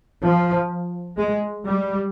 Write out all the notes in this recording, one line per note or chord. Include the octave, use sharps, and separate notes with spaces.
F3
G#3
G3